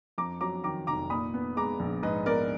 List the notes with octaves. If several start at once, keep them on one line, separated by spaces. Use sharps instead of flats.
F2 A#5 D6
F#3 A#5 D6
D#3 A#5 D6
F1 A#5 D6
A#2 B5 D#6
B3
G#3 A#5 D6
A#1
G#2 B4 D#5
B3 A#4 D5